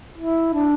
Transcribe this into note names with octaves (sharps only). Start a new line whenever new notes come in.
E4
D4